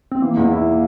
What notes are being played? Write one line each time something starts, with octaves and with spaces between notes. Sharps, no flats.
C4
E3 A#3
E2
E4